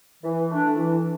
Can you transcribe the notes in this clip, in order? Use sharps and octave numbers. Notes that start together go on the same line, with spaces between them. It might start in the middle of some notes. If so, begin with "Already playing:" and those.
E3
A3 D4
E3